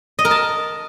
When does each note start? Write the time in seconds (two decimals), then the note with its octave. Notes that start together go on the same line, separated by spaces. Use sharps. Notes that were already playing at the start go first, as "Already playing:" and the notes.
0.19 D#5
0.25 A#4
0.31 A5